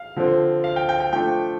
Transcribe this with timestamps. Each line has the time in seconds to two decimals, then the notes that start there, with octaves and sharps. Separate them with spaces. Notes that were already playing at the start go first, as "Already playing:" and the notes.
Already playing: F5
0.16 D3 F3 C4
0.64 F5
0.76 G5
0.89 G5
1.00 G5
1.13 F3 A3 D4 G5